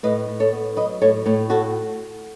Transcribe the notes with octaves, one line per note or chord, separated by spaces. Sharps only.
A2 B4 D#5
A2
A4 C#5
B3
F#3 B4 D#5
A2 A4 C#5
A2 A4 C#5
F#4 A4